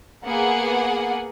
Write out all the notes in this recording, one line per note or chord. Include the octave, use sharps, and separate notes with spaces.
A#3 B3 G#4 F#5